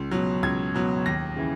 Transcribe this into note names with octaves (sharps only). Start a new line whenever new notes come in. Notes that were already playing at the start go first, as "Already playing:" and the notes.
Already playing: C#2
B2 F#3
C#2 G#6
B2 F#3
D#2 A#6
C#3 E3